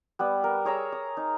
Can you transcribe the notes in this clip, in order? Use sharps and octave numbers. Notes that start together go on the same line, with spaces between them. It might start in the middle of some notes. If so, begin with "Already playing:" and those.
G3 B3 B4
A#4
G#4 C#5 A#5 E6
D#6
D#4